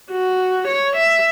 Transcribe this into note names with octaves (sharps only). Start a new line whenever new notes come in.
F#4
C#5
E5